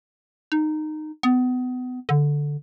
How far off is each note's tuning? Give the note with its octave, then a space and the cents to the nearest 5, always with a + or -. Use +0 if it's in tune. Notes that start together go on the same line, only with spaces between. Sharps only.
D#4 -15
B3 +30
D3 -5